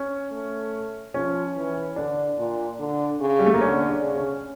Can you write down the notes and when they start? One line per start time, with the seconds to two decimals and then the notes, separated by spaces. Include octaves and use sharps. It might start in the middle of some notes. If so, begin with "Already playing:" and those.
Already playing: C#4
0.32 A3
1.14 F3 C#4
1.56 E3
1.96 D3 D4
2.38 A#2
2.79 D3
3.20 C#3
3.39 G3
3.46 A3
3.54 A#3
3.61 D3 C#4
3.89 D4
4.02 C#3
4.16 C#4